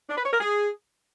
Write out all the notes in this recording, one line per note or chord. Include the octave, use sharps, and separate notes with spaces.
D4
B4
C#5
A#4
G#4